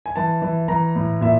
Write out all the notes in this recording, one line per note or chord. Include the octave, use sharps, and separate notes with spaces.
G#5
E3 A5
E3
E3 A#5
A2
A#2 E5